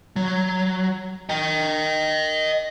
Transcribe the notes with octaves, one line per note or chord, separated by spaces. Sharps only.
F#3
D#5 G5